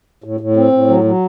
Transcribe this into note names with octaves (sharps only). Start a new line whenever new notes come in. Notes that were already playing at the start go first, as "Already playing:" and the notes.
A2
A2
C4
A2
F#3
F#3